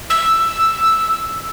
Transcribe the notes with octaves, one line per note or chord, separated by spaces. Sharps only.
E6